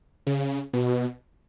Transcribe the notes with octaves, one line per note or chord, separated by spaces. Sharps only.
C#3
B2